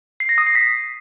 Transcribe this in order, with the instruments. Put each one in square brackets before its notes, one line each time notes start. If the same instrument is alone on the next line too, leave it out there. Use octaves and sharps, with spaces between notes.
[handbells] C7
A#6
D#6
C7
B6